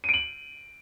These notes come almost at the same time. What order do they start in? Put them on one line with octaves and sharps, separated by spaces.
D#7 D7 F#7